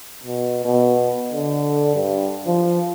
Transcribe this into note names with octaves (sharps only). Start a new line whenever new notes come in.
B2
B2
D3
G2
F3